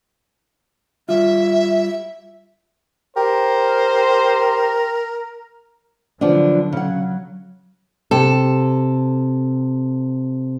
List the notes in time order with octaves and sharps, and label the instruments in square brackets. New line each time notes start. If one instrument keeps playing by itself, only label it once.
[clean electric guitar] G3 F4 [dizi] E5
[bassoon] G4 [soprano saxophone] A#4 [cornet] C5
[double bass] D3 F#3 [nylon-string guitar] F3 B3 D4
[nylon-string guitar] C#3 F#5 [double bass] F#3
[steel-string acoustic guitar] C3 A4